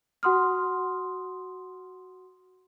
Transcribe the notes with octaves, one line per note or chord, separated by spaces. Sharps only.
F#4 F#5 C6 D#6 F6